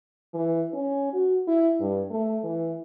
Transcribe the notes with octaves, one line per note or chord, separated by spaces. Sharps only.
E3
C#4
F#4
E4
G2
A3
E3